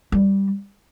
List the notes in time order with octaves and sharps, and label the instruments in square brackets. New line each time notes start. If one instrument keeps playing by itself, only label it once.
[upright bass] G3